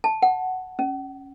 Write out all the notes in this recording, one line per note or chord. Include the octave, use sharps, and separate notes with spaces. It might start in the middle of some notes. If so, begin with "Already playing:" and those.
A5
F#5
C#4